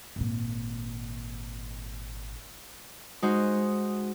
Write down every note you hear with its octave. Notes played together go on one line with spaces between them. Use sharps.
G#1 A#2
G#3 D#4 F#4 C5